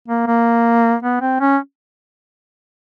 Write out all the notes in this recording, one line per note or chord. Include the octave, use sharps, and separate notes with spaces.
A#3
A#3
B3
C4
C#4